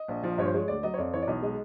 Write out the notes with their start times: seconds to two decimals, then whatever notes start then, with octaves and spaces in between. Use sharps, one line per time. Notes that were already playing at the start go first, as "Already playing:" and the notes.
Already playing: D#5
0.08 A#1
0.23 F3
0.38 G2 C#5
0.45 C5
0.54 G#3 C#5
0.68 D2 D5
0.83 F#3 D#5
0.94 C#5
0.98 F2 D5
1.13 E3 C#5
1.22 D5
1.27 B1 D#5
1.42 G#3 D#5